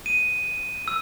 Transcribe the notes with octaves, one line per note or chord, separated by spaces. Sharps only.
D#7
E6